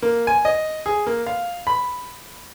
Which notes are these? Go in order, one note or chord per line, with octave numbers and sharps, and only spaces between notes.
A#3
G#5
D#5
G#4
A#3
F5
B5